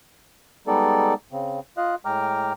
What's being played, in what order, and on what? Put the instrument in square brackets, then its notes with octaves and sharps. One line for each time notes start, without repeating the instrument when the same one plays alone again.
[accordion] G3 G#3 B3 D#4 A4 D5
C#3 C4
F4 D#5 F5 F#6
A2 G#3 G5 A#5 D6 F6